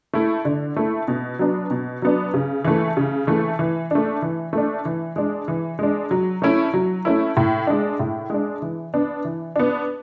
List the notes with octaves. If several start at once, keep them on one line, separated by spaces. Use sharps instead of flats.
A3 E4
D3
A3 E4
B2
F#3 B3 D4
B2
F#3 B3 D4
C#3
E3 A3
C#3
E3 A3
E3
A3 D4
E3
A3 D4
E3
G#3 D4
E3
G#3 D4
F#3
A3 C#4 E4
F#3
A3 C#4 E4
A2
G#3 D4
A2
G#3 D4
E3
B3 D4
E3
B3 D4